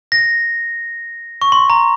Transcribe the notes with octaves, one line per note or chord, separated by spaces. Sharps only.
A#6
C#6
C6
A#5